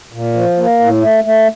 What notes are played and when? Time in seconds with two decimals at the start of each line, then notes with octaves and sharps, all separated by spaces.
0.12 A#2
0.34 F3
0.57 A#3
0.80 A2
1.01 A3
1.24 A3